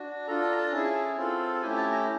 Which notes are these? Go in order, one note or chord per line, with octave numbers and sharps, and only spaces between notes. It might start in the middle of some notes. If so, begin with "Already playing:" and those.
Already playing: D4 F#4
D4 F4 A4 A#5
A5
A#5
A5
C#4 E4 G#4
C4 F4 A4
A3 C#4 E4 G4 G#5
A5
A#5